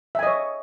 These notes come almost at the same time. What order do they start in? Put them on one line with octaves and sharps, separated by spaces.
E5 G#5 D#5 C#5